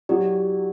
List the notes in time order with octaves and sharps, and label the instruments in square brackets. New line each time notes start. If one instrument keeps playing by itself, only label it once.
[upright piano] F#3 [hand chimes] E4 G4 D5